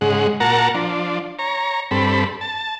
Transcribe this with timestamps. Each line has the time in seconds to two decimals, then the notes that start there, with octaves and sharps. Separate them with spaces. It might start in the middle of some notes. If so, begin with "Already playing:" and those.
0.01 G#2 C#3 G#3 F#5
0.40 A#2 F#4 A#4 F#5 A5 A#5
0.74 F3 D4
1.39 C#5 A#5
1.91 G2 C4 A4 B5
2.41 A5